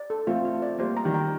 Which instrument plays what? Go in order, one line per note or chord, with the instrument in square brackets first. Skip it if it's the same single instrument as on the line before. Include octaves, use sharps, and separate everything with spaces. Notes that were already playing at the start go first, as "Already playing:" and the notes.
Already playing: [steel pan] D5
A4
[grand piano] A3 C4 [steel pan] F4
[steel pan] F4
D5
[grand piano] G3 A#3 [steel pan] C5
[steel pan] A#5
[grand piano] D#3 G3
[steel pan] G5